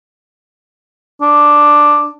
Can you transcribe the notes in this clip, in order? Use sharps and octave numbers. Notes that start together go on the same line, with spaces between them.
D4